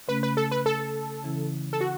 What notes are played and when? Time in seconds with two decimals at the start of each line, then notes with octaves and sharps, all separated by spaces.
0.08 C#3 A3 C#4 B4
0.23 B4
0.37 A4
0.51 B4
0.66 A4
1.23 C#3 E3 C#4 E4
1.73 A4
1.81 F#4